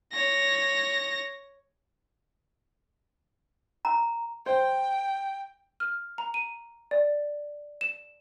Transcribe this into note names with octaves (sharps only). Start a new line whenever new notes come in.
C#5 A#6
A#5
C5 G5
F6
A#5
D#7
D5
E7